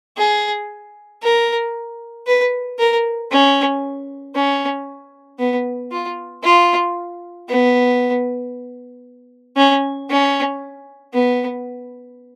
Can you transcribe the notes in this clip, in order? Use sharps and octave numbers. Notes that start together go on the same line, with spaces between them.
G#4
A#4
B4
A#4
C#4
C#4
B3
F4
F4
B3
C#4
C#4
B3